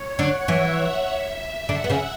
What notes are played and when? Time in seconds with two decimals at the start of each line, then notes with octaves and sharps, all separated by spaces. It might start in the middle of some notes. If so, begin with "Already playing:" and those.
Already playing: C#5
0.19 D3 D4 F#5
0.48 E3 E4 E5
1.69 D3 D4 F#5
1.84 B3
1.90 C#3 C#4